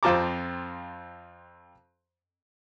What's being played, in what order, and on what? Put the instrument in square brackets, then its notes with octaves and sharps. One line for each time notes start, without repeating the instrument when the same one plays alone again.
[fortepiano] F2 C4 F4 A5 A#5 D6